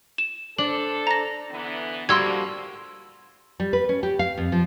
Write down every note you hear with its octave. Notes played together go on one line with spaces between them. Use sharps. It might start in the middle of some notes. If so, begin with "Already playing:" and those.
E7
D4 A4 C5 F#7
A#5 A#6
D3 E3 B3
D3 F3 G3 A#3 F#4 C6 E6 G#6
G3
B4
C#4
G4
F5
F2
F3